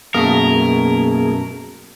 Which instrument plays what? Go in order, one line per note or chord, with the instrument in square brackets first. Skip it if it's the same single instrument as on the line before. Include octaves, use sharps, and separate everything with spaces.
[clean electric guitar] F#2 B2 A3 [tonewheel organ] A#3 G#4 [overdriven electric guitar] A#4